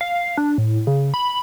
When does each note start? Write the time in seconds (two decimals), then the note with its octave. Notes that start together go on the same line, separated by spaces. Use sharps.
0.01 F5
0.37 D4
0.58 A2
0.87 C#3
1.14 B5